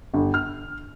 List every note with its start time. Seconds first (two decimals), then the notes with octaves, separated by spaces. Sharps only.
0.14 G1
0.34 F6